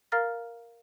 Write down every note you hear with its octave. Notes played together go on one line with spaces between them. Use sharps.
A#4 F5 A#5 F6 A6 A#6